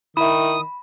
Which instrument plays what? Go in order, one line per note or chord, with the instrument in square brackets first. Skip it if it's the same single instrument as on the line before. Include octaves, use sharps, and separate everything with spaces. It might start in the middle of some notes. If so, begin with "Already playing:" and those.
[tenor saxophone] D#3 [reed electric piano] E4 E5 [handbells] B5 [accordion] D#6